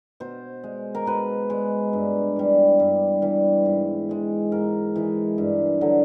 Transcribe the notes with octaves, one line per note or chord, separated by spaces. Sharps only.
B2 C5
G#3
A#4
B2 B4
G#3
G2
E3 G3
G2
E3 G3
G#2
E3 G#3
G#2 A#4
E3 G#3
G2
D3 F#3